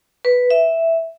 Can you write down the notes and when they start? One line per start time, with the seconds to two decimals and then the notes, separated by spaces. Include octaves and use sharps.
0.25 B4
0.50 E5